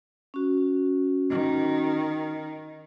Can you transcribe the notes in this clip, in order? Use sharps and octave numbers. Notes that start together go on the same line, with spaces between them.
C#4 F#4
D#3